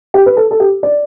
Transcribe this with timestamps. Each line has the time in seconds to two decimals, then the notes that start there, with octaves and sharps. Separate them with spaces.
0.14 G4
0.26 B4
0.37 A4
0.51 A4
0.60 G4
0.83 D5